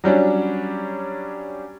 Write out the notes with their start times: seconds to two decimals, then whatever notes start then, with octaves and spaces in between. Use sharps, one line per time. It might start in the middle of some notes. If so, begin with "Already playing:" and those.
0.04 F#3 G3 C#4 D4